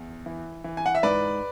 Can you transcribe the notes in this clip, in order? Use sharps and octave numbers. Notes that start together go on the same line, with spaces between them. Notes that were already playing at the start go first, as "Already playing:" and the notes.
Already playing: E2
E3
E3
G#5
F#5
E5
G#2 B4 D5